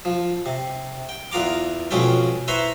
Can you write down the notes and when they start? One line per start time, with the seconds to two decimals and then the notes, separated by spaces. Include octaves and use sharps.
0.05 F3
0.46 C3
1.09 G5
1.32 E2 B3 F4 A#5 D6
1.91 F2 B2 G#3 C#4 F4 G5
2.48 E4 B4 C5 A#5 C6 C#6